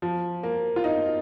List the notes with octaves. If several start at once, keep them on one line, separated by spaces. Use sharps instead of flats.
F3
A#3
F4
D#4